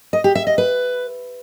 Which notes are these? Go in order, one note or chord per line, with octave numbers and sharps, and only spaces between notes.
D#5
G4
E5
D#5
B4